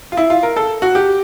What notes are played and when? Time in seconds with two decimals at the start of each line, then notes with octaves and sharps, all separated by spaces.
0.12 F4
0.17 E4
0.30 F4
0.43 A#4
0.56 A4
0.82 F#4
0.95 G4